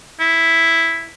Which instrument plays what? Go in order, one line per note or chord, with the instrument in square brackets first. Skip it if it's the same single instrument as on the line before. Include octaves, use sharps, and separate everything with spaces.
[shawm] E4